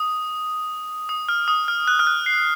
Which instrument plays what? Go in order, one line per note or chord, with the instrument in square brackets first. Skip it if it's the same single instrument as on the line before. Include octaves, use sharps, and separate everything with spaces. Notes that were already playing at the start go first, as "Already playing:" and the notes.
Already playing: [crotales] D#6
D#6
F6
D#6
F6
F#6
F6
F#6
C7